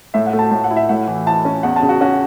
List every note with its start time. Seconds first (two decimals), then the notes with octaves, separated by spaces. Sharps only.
0.14 A2 E5
0.26 F#5
0.33 A3
0.39 A5
0.51 A2 A5
0.64 F#5
0.71 E4
0.77 E5
0.89 A2 F#5
1.08 E3
1.27 E4 A5
1.45 C#4
1.63 E2 F#5
1.76 A5
1.82 C#3
1.89 F#4
2.01 C#4 F#4